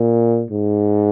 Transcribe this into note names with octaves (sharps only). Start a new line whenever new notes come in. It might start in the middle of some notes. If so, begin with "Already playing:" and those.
Already playing: A#2
G#2